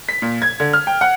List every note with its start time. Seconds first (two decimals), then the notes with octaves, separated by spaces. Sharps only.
0.09 B6
0.22 A#2
0.42 G#6
0.60 D3
0.73 F6
0.87 G5
1.01 F#5